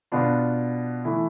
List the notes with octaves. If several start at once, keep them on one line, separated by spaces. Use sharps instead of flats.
B2 B3 D4 F4
E3 A3 E4